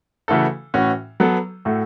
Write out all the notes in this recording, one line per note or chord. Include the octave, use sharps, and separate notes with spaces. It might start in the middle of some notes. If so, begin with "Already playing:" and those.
C#3 E3 A3 F#4 A4
A2 E3 C#4 F#4
F#3 B3 A4
A2 A3 F#4 A4